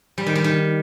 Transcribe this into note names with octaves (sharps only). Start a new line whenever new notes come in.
G3
D#3
G3
D#3